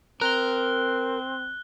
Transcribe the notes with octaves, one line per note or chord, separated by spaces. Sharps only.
C4 A#4 F#6 G7